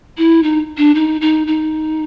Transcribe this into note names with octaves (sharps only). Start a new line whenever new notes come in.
E4
D#4
D4
D#4
D#4
D#4